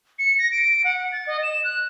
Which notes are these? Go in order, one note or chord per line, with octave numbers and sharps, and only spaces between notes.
C#7
A#6
D7
F#5
A6
D#5
E7
F#6